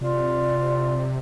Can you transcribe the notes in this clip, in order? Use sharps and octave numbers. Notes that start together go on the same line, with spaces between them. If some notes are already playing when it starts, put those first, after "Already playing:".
C3 F4 D5